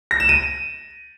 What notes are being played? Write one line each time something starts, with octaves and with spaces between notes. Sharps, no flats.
A#6
E7
D#7